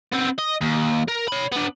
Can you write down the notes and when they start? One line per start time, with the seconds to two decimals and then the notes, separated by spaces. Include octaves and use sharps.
0.12 B3 C4
0.38 D#5
0.61 D#2
1.08 A#4
1.28 C#5 B5
1.52 B3 D4